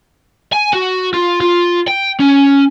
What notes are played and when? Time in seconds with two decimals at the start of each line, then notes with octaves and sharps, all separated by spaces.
0.53 G#5
0.73 F#4
1.14 F4
1.41 F4
1.88 G5
2.20 C#4